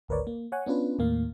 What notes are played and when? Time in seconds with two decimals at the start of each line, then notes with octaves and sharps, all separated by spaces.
0.08 G#1 D2 A#4 B4 C#5 D5
0.27 A#3
0.52 C#5 F#5 G#5
0.66 B3 C#4 D4 F4 B4
0.99 D#2 A2 A#3 F5